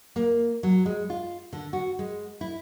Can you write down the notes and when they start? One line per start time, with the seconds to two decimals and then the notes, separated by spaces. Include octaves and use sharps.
0.16 A#3
0.63 F#3
0.86 G#3
1.10 F4
1.53 D3
1.73 F#4
1.99 G#3
2.41 E4